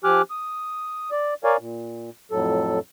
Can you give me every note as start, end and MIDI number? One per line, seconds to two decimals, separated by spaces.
0.04 0.22 53
0.04 0.22 67
0.04 0.22 80
0.04 0.22 86
0.04 0.22 89
0.04 0.22 90
0.30 1.10 87
1.11 1.34 74
1.44 1.57 70
1.44 1.57 73
1.44 1.57 74
1.44 1.57 77
1.44 1.57 80
1.60 2.10 46
2.31 2.79 41
2.31 2.79 45
2.31 2.79 54
2.31 2.79 69